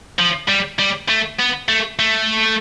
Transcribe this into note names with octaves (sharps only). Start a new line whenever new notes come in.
F3
G3
G3
A3
B3
A3
A3